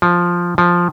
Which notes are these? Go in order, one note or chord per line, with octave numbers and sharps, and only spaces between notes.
F3
F3